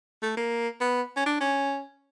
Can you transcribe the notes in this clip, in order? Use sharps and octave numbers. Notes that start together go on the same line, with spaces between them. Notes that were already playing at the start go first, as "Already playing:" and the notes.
A3
A#3
B3
C#4
D4
C#4